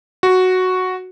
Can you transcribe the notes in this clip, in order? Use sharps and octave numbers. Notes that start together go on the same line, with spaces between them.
F#4